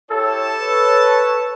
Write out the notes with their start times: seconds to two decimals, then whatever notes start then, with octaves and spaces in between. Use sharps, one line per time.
0.11 E4 G4 A4 C#5 A5
0.61 B4 C#5